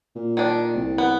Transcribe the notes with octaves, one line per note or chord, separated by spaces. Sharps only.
A#2
D#3 D4
C2
B3